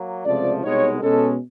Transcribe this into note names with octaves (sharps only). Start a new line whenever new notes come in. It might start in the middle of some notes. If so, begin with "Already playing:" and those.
Already playing: F#3 A#3
C#2 C3 F3 A3 D5
C2 B2 G#3 B3 D#4 C#5
B2 G#3 C#4 A4